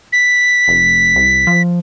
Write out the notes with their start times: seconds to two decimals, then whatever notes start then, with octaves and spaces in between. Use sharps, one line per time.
0.12 B6
0.68 F1
1.16 C2
1.47 F3